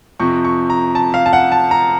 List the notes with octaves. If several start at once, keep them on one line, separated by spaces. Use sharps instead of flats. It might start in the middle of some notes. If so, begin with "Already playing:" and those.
F2 C3 F3 C#6
C#6
A#5
A5
F5
A5
F#5
A5
A#5